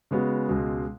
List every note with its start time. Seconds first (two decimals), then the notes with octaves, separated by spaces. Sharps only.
0.11 C#3 G#3 B3 F#4
0.49 C#2 B2 G#3